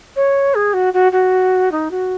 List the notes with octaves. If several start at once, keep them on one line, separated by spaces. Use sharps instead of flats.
C#5
G#4
F#4
F#4
F#4
D#4
F#4